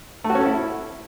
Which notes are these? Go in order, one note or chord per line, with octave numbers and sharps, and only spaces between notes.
A3
F#4
C#4
A4
E4